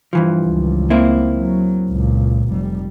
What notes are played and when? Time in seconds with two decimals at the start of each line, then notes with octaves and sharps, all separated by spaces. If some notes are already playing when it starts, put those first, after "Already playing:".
0.13 G2 E3 F3
0.46 C#2 G3
0.90 A#3 C4 E4
1.38 F#3
1.90 C#2 A#2
2.50 F1 G3